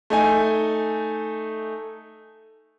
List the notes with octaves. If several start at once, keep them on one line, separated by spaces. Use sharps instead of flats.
A3 D#4 G#5